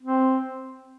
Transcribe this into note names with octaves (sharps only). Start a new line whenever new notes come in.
C4